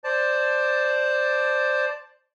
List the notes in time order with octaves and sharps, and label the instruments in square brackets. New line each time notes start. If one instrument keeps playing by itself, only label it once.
[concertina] C5 D5 A5